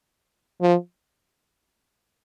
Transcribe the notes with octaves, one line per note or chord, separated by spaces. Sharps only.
F3